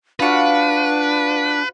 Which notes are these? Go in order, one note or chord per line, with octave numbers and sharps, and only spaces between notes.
D4 F4 F#4 B4